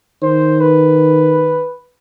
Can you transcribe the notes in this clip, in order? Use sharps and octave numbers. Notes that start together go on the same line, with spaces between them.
D#3 C5
B4